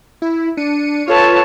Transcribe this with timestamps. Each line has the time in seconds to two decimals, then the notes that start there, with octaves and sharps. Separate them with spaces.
0.22 E4
0.57 D4 C#7 D#7
1.08 F4 A4 B4 C#5 A5